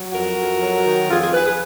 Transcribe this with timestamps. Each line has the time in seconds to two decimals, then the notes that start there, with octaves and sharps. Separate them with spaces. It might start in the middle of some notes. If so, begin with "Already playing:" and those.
Already playing: F#3
0.13 F2 F#4 A#4
0.37 F2
0.61 F#3
0.86 D#3
1.09 F2 F4 G#4
1.21 F4 G#4
1.33 F2 G#4 B4
1.45 G#4 B4